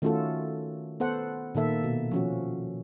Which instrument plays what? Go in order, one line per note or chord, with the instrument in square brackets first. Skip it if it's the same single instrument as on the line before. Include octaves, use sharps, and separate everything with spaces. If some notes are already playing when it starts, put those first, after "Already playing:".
[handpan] D#3 A3 C#4 F4 F#4 A4
B3 A4 C5 F#5
A#2 D#3 A#3 A4 E5
B2
F3 C#4 F#4